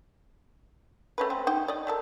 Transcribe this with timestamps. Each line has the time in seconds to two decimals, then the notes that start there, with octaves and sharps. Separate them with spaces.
1.18 A3 C#4 B4
1.30 C4
1.47 D#4 G5
1.68 D5 D#5
1.87 A3 A4 A#4